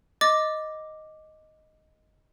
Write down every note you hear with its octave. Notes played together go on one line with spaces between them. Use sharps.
D#5 D6 A6